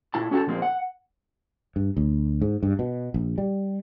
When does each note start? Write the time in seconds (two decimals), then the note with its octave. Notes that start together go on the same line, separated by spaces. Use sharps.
0.14 A#2 E4 A5
0.31 C#4 F#4 A4 G5 A5
0.47 A#2 F3 A#3 C4
0.62 F#5
1.76 G2
1.97 D2
2.42 G#2
2.63 G2
2.79 B2
3.14 A#1
3.38 G3